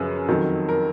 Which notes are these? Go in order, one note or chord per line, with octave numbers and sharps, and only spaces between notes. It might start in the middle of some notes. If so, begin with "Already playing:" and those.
Already playing: F#2 C#3 F3 B4
F2 D#3 F#3
A#4